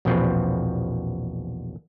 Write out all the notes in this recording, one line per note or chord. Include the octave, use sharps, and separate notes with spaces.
A#1 E2 B2 F3 C4 B4